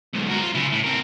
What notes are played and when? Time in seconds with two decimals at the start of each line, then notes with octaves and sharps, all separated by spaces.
0.13 B1 G#2
0.29 F#4 A#4
0.41 F4
0.54 C#3 E4
0.72 A2
0.84 C4 A#4